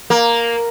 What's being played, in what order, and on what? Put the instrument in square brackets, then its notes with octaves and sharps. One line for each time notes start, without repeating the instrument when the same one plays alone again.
[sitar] A#3